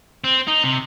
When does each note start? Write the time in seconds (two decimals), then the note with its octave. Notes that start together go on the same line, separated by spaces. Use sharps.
0.24 C4
0.47 D#4
0.64 C3